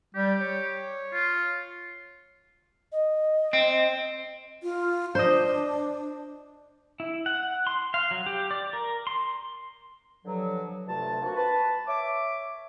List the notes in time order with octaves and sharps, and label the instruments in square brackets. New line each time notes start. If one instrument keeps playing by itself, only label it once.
[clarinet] G3 [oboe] G4
[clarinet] C#5
[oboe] F4
[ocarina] D#5
[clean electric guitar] C4
[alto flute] F4
[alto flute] D4 [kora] C5 D#5
[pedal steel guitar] E4
F#5
C6
F5
F#3
G4
D5
A#4
C6
[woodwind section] G2 D3 F3 F#3
D2 G2 C3 A3 F4 A5
A#3 C4 D4 F#4
B4 A5
C#5 E5 D6